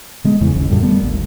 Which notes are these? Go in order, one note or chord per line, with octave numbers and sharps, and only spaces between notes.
D3 G#3 B3
E2 G2 C#3 E3
G1 D#2 C#3
F#2 A2 D3 G3
D#3 G3 A3 B3
G#1 D2